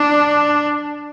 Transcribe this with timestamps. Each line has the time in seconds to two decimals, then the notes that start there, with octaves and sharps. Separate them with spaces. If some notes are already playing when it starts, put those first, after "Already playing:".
Already playing: D4